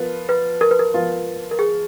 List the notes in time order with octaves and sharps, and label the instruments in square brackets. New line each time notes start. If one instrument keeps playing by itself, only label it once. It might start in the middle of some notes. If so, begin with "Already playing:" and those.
Already playing: [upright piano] F3 B3 F4 [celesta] A#4
[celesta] B4
A#4
B4
A#4
[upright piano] F3 B3 F4
[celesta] A#4
G#4